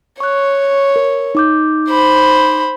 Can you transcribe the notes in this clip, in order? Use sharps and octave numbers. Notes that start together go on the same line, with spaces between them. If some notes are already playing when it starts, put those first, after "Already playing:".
C#5 C#6 F#6
A#4
D#4 D6 G6
C5 B5